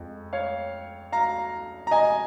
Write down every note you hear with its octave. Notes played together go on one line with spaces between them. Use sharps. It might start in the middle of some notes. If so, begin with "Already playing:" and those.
Already playing: F2 F3 G#3
C#5 F5
F5 A#5
A#5
D#5 G#5